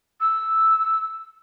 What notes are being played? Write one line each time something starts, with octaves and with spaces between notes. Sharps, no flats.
E6